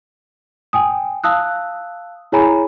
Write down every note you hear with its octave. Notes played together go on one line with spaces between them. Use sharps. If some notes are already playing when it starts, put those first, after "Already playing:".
G5 G#5 D#6
F5 A5 D#6 E6 F#6
E4 G#4 C#5 G#5 A#5 B5